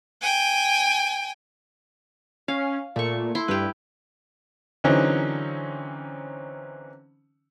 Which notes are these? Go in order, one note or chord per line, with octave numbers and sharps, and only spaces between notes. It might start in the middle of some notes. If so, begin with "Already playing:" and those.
G5 G#5
C#4 F5
A#2 A3 C#6
E4 C6
G2 G4 B4
D3 E3 F#3 C4 C#4 D#4